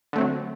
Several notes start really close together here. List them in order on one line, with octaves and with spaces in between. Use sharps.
D3 A3 C4 F#3